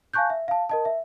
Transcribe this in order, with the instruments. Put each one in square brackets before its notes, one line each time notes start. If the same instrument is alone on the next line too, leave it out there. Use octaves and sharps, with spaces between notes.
[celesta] F5 G#5 A5 C#6 F#6 G6
E5
F5 A5
A#4 D#5 A5
E5